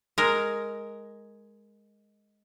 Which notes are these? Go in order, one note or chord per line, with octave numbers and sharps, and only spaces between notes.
G#3 A#4